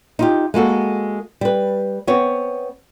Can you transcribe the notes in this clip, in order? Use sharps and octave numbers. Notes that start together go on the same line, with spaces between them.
D#4 F4 G4
G#3 A#3 F#4 A4
G3 B4
B3 C4 C#5